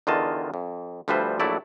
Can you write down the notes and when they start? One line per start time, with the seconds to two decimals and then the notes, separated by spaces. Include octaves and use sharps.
0.07 E2 D3 D#3 F4 D#5 A5
0.54 F2
1.08 D2 F3 G3 B4 C5 E5
1.40 A#1 F#3 A3 E4 D5